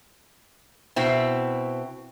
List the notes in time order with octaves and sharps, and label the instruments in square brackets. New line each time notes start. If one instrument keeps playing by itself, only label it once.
[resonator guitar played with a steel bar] B2 C4 E4